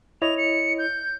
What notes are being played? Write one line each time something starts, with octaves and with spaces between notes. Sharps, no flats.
E4 C#5 D#5 F7
C#7
G6